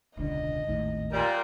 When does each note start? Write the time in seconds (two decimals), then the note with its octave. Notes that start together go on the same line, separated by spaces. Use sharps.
0.17 E1 C#2 D3 D#5
0.67 G#1 D#2 A2
1.12 A#2 G3 A#4